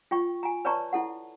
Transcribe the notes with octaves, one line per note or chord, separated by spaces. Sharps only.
F4 G5 C#6
G#5 A#5
B4 C#5 D5 A5 A#5 C#6
E4 A4 F#5